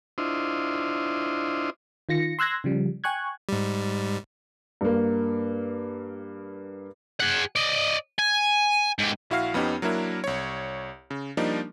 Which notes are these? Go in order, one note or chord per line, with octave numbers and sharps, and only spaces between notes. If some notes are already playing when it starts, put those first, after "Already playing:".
D4 E4 F4 C5 D#5
D#3 F4 A#6 C#7
C6 E6 F#6 G#6 A#6
C#3 F3 G3
G5 G#5 C#6 F#6 G#6
G#2 G3
G2 A#3
G#4 F#5
D5 D#5
G#5
G#2 G4
A#1 E4 F#4 F5 F6 C7
F2 B3 C#4 D#4 G4
F#3 A#3 D4 E4 A#4
C2 C#5
C#3
F3 G3 A#3 D4 D#4